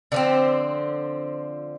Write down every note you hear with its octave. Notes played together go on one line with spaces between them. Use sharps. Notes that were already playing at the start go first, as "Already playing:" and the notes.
D3 F3 C4